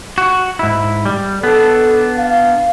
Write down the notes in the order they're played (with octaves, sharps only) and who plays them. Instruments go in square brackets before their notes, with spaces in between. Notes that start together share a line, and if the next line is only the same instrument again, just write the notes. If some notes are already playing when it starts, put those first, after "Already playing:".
[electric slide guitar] F#4
G#2 E4
G3
[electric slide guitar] B3 D4 [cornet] A4
[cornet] F5